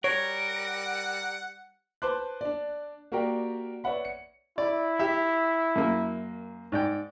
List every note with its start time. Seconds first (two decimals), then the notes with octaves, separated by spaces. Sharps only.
0.04 G3 A#4 C#5 F#5
2.02 B4 C5 A5 C6 D6 F#6
2.41 D4 D5
3.12 A#3 F#4 G4 A#4 D5 G5
3.84 B4 C#5 D5 E5 F#5 B5
4.05 C#7
4.58 E4 D5
4.99 G4 E5
5.76 F#2 A#3
6.72 G#2 D5 G5